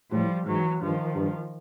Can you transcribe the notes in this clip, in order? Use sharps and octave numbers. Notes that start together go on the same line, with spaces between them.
A2 F3 G3
G#2 E3 F#3
G2 D#3 F3
G2